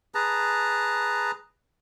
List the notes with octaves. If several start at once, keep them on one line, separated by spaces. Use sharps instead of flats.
G#4 B4 A5 A#5